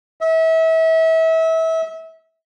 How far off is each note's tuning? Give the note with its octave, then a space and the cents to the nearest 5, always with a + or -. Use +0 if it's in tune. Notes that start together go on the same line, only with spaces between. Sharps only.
E5 -30